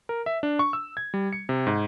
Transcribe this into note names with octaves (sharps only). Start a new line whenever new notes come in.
A#4
E5
D4
C#6
E6
G#6
G3
C#7
C3
G#2